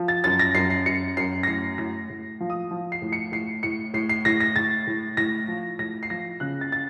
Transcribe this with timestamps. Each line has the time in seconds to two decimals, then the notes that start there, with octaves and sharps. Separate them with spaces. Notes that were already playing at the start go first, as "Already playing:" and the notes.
Already playing: F3
0.08 A6
0.24 F#2 A6
0.39 A#6
0.55 F#2 C7
0.70 C7
0.86 F#2 C#7
1.17 F#2 C7
1.43 A#6
1.47 A2 C7
1.78 A2 A#6
2.10 A2
2.40 F3
2.50 D#6
2.71 F3
2.92 C7
3.02 A2
3.13 C#7
3.32 A2 C7
3.63 A2 C#7
3.94 A2 C7
4.09 C7
4.25 A2 A#6
4.40 A#6
4.56 A2 A6
4.87 A2
5.17 A2 A#6
5.48 F3
5.79 A2 A#6
6.03 C7
6.10 F3 A#6
6.40 C#3 F#6
6.61 A6
6.72 A6